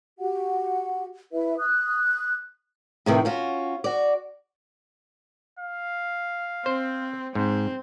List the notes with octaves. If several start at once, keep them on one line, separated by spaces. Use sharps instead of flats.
F#4 G4 F#5
E4 B4 E5
D#6 F#6
A2 C3 D#3 E3
C#4 F4 F#4
F#4 D5
F5
C4 C5
G#2 C4